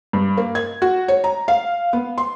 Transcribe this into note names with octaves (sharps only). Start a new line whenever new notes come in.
G2
A#3
G#6
F#4
C#5
A#5
F5
B3
C6